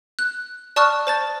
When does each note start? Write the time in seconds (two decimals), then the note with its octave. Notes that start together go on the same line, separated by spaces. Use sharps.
0.19 F#6
0.76 D5 A5 C#6 D#6 F6 F#6
1.07 C5 A5 A6